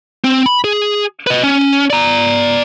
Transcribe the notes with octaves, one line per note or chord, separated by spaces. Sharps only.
C4
B5
G#4
B4 D#5
C#4
D5 A#5